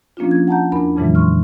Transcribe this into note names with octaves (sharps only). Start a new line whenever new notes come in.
F3 A#3 C#4 D4 F4
G#6
F#5 A5 A#5 G6
E2 D4 A#4 B5
F2 A#2 C#3 E3 F#3 G#3
C6 C#6 F6